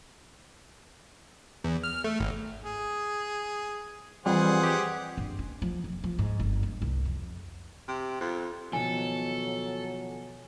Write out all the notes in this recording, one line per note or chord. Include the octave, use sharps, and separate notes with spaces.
E2
F6
A3
G#1
G#4
F2 E3 G3 G#4 C5 F#5
G4
G2
C#4
F3
F1
F3
G#2
G1
G2
C2
F2
C3
F2
B2 D#3 F3 F#3 A4 G#5